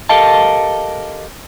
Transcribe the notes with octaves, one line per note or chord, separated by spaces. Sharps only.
G4 A4 A#4 D#5 F5 A5